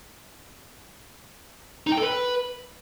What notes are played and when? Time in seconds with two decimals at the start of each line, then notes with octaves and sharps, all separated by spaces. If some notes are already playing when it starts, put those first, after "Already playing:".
1.87 D#4
1.92 G5
1.97 A4
2.02 B4